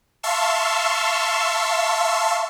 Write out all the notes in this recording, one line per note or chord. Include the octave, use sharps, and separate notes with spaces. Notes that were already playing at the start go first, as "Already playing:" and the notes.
E5 F5 A5 C6 C#6 E6